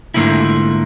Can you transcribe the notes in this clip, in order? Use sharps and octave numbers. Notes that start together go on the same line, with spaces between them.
G#2 D3 F3 A3 A#3 E4